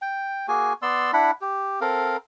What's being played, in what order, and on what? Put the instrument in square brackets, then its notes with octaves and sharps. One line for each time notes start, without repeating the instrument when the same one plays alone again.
[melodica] G5
A#3 F#4 G#4 G#5
B3 D5 C6 E6
D4 E4 F#5 B5
G4
C4 A4 A#4 F5